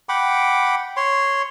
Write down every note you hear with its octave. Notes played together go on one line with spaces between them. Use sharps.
F#5 G5 B5 D6
C#5 C6